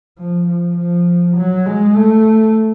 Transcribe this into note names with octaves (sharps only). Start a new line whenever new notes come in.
F3
F3
F3
F#3
G#3
A3